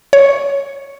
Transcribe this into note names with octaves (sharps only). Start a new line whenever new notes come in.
C#5